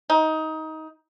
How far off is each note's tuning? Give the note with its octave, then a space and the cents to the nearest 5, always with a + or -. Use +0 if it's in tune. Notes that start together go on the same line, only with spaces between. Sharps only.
D#4 +20